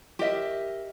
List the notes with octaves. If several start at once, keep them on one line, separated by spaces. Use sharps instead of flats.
G4 A#4 D#5 E5